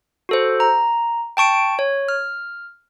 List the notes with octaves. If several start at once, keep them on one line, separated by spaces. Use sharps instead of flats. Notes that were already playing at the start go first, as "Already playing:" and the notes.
F#4 A4 C5
A#5
G5 A5 C#6 D7
C#5
F6